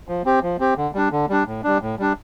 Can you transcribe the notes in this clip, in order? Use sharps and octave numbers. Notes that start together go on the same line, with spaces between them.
F3
C4 G4
F3
C4 G4
D3
G3 D4
D3
G3 D4
A2
G3 D4
A2
G3 D4